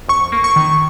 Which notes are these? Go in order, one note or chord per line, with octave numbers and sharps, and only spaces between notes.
F2 C#6
A#3
C#6
D#3